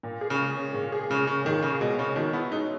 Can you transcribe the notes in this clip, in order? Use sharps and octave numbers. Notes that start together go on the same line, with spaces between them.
A#2
G#4
C#3
G#3
C#4
A#2
G#4
C#3 G#3
C#3 C#4
A#2 D#3
C#3 G#4
B2 G#3
C#3 C#4
B2 D#3
B3 E4
G#3 D#4